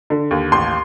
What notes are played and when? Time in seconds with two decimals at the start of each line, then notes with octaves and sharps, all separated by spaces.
0.10 D3
0.31 D#2
0.52 A1 C6